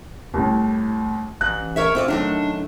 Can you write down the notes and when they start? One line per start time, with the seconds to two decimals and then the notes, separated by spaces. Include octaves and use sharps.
0.34 C2 A2
1.41 A1 F#6
1.76 A#4 C#5 E5
1.95 C4 F4 D5
2.08 F#2 D#3 A3 D4